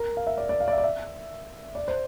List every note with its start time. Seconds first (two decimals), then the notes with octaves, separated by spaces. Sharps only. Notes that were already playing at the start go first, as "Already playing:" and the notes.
Already playing: A#4
0.17 F5
0.27 E5
0.38 D5
0.49 D5
0.60 F5
0.68 D5
0.72 E5
0.78 D5
0.84 E5
1.75 D5
1.88 C5